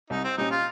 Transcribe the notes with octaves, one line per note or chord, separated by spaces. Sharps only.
C2 D#4
C4
A#2 G3 C#4 D#4 G4
F4